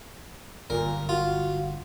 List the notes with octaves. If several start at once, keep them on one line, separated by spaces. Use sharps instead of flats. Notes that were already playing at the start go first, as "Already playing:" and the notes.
G1 F#2 A#2 A#4
F4 F#4